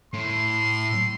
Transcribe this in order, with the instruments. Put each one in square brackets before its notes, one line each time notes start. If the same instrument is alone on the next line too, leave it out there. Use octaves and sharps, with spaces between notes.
[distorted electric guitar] A2 [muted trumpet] C6